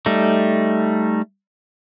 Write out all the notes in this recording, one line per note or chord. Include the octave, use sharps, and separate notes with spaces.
G3 A3 D#4